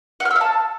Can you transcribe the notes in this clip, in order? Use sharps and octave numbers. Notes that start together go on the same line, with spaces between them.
F#5
F6
E6
F5
A5